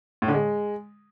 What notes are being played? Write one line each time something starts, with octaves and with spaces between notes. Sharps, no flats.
A2
D3
G#3